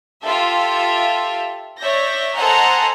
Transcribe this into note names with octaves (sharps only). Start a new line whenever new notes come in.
F4 G4 A4 E5
C#5 D5 E5 G6 A#6
A4 C5 D#5 F#5 G#5 A#5